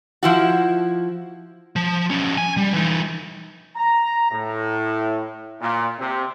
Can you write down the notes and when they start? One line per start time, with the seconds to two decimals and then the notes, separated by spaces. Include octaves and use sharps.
0.23 F3 E4 F#4
1.76 F3
2.10 F3 C#4
2.38 G#5
2.57 G3
2.74 E3 D#4
3.76 A#5
4.31 A2
5.61 A#2
5.99 C3